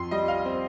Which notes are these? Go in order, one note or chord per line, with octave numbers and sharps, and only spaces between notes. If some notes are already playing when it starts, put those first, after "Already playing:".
Already playing: F2 C6
G3 D#5
F5
C4